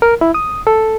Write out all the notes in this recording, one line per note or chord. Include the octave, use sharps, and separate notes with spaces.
A#4
E4
D#6
A4